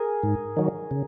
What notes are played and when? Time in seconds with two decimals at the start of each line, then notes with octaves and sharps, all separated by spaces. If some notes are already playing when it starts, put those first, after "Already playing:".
Already playing: G#4 A#4
0.23 G#2
0.57 D#3 F#3
0.91 C#3